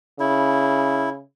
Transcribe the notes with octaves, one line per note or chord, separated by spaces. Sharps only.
C#3 E4